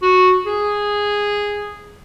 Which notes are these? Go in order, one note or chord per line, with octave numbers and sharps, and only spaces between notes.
F#4
G#4